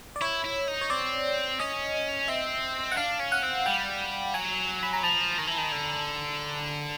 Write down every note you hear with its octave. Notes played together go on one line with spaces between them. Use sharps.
D5
E4 C#5
E4
D#4
C#5
C4 D5
C#4 D#5
C4 E5
F#5
D4 F5
C#4
F#5
C4
G3 G5
F#3 G#5
B5
A#5
F3 A5
D#3 A#5
E3
D#3
D3